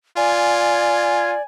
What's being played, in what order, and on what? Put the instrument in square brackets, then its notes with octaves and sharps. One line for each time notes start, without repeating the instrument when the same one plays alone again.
[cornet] F4 [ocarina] D5 [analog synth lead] G#5